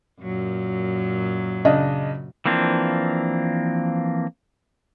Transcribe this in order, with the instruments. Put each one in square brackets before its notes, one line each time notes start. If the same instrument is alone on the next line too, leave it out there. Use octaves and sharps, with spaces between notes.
[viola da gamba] F#2 A#2 F#3
[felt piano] C#3 D4 D#5
[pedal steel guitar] E3 F3 A#3 C4 D4